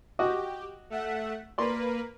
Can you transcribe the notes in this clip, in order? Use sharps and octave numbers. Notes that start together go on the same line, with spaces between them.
F#4 G4 D#5 D6
A3 E5 F#5
A#3 A#4 B4 D5 C6